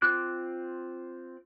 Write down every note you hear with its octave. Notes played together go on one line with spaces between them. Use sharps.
C4 F4 D6 F#6